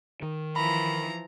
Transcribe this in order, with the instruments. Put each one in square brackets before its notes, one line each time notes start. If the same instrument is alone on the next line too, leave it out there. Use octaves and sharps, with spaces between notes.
[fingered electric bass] D#3
[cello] E3 F3 [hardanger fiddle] A#5 [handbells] B5